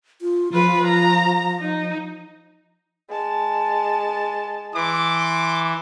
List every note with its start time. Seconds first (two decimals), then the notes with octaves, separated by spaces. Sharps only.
0.22 F4
0.53 F3 F4 B4
0.86 A#5
1.60 D#4
3.10 G#3 A5
4.74 E3 C6 D6